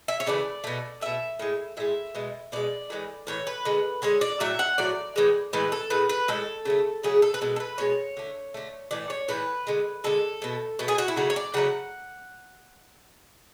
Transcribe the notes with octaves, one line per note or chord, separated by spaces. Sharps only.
E5
C#5
C#3 E3 A3 D5
B2 A3
B2 A3 E5
A2 G#3
A2 G#3 E5
B2 G#3
B2 G#3 D5
A2 E3 G#3
A2 E3 C#5
B4
D3 G#3
D3 G#3 C#5
D5
A2 F#3 A3 E5
F#5
A2 F#3 A3 D5
A2 E3 G#3
A2 E3 G#3 B4
A4
A2 G#3 B4
B4
A2 G#3 A4
C#3 F#3 A3
C#3 F#3 A3 G#4
A4
B4
B2 G#3 A4
A4
B4
B2 G#3 C#5
D3 A3
D3 A3
A2 E3 A3 D5
C#5
A2 E3 A3 B4
D3 G#3
D3 G#3 A4
B2 A3
B2 A3
G#4
F#4
E4
C#3 F#3 A3 F#4
C#5
D5
C#3 F#3 A3 F#5